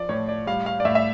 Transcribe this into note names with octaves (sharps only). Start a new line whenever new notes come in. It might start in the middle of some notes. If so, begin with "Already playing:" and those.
Already playing: F3 D5
A2 C#5
D5
G3 F5
F5
D5
A2 E5
E5